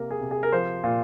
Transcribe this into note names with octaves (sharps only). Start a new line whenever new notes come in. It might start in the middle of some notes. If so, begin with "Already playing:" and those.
Already playing: C3 A#3 A#4
G#4
C3
G#4
A#4
F3 C5
A#2